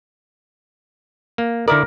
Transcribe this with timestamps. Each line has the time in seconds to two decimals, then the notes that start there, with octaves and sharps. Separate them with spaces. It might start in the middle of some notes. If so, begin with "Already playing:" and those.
1.38 A#3
1.68 D3 E4 A#4 D5